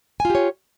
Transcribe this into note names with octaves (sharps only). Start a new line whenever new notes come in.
F4 G4 C#5 G#5